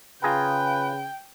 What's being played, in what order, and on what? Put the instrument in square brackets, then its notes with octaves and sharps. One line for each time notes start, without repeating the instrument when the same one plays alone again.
[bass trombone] C#3 [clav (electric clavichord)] F4 G#4 A#5 [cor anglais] B4 [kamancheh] G5